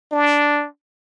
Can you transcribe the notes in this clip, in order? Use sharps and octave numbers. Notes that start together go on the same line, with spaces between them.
D4